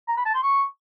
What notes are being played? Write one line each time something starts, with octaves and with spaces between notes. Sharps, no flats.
A#5
B5
A5
C6
C#6